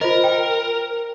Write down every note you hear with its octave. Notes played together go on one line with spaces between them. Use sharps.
F4 A#4 C5 D#5
G5